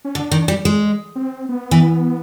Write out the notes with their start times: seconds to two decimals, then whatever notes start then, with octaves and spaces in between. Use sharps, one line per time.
0.05 C#4
0.15 D3 D4
0.31 D#3
0.48 G3
0.65 G#3
1.16 C4
1.49 B3
1.71 E3